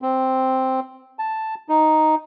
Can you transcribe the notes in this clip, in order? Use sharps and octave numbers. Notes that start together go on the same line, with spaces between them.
C4
A5
D#4